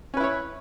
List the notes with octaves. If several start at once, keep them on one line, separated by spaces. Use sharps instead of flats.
C#4 E4 B4 C#5